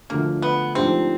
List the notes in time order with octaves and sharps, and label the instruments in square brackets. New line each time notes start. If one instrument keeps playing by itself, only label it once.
[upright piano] D2 D3 F3 A3 D4 [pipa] A#3
[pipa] B3
[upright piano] G#2 F3 A3 D4 G4 [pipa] C4